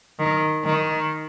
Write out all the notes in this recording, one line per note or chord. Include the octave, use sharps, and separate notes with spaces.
D#3
D#3